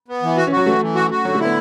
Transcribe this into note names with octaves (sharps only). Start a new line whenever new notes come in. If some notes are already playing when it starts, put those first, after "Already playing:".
B3
E3
F#4
C#4
F#3 F#4
E3 A3
E3
F#4
F#4
D3 F#3
A3
B3 E4